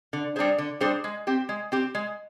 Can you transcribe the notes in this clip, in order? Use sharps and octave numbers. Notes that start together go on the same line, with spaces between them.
D3
G3 D4 G#4 C5
D3
G3 D4 G#4 C5
G#3
C4 G4
G#3
C4 G4
G#3